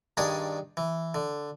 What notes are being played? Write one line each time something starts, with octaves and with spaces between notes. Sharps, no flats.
G2 D#3 D4 G#4 D#6
E3
D3